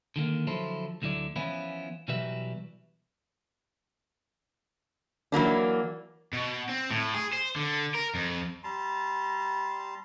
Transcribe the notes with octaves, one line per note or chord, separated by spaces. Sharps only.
D3 D#3 A3 A#3
D3 F3 F#3 E4 A4 C5
D2 D3 F#3 E4 D5
E3 F3 B3 C#4 E4 F4
B2 E3 F#3 G3 B4 E5
E3 F#3 A#3 D4
B2
C4
A2
G#4
C5
D3
A#4
F2
G3 A5 A#5 C6